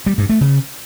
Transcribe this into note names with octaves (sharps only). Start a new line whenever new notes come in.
G3
G2
A3
C#3